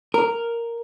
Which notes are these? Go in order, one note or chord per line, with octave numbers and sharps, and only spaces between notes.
A#4